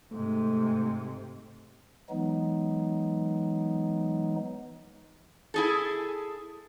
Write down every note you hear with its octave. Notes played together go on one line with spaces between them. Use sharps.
G#2 C3 A3
E3 F#3 G#3 B3 D#4
E4 G#4 A4